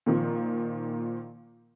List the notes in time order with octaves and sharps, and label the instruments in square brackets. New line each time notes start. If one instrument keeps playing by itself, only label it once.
[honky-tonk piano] A#2 D#3 F3